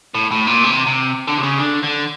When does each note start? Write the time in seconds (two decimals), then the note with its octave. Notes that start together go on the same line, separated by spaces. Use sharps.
0.15 A2
0.31 A2
0.47 A#2
0.64 C3
0.87 C3
1.28 D3
1.38 C3
1.43 C#3
1.59 D3
1.83 D3